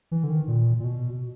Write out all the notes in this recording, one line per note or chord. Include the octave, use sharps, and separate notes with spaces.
E3
D3
D#3
A#2
A#2
B2